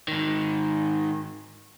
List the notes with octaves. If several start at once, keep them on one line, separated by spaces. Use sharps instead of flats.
G#2 D#3